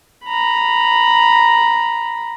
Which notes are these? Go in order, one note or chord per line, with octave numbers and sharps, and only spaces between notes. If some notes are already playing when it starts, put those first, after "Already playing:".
A#5 B5